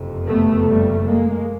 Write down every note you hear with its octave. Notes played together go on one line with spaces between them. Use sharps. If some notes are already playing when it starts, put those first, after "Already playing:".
Already playing: F#1 F2 C3
A3 B3
G3 A3
G#3 A#3